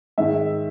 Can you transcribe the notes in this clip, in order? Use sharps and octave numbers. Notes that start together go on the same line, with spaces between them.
G#2 D#3 E5